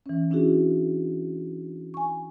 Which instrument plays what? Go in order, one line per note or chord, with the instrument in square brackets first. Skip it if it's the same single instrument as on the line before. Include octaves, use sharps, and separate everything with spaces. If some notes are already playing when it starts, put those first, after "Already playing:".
[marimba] E3 C#4
C#4 D4 E4 F#4 G#4
G#5 C#6